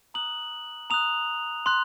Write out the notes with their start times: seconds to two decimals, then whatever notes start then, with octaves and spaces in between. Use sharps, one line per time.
0.14 A#5 D#6 F#6 F#7
0.90 A#5 D#6 F#6 F7
1.66 C6 F#6